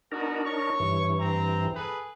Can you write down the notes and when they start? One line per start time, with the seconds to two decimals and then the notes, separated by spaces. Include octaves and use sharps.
0.12 B3 D4 D#4 F#4 A#4
0.44 C#5 C#6
0.80 G2 E3
1.19 C4 A#5
1.74 G#4 A4 B4